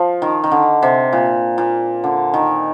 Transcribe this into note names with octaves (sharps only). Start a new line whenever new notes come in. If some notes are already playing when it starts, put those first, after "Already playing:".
Already playing: F3
D#3
D#3
D3
C3
A#2
A#2
D3
D#3